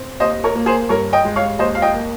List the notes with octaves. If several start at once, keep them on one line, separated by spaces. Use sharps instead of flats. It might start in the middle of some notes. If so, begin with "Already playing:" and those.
Already playing: C4
D#2 C5 D#5
A#4 C#5
A#3
G#4 C5
G2 A#4 C#5
D#5 G5
G#3
C#5 F5
D#2 C5 D#5
F5
D#5 G5
A#3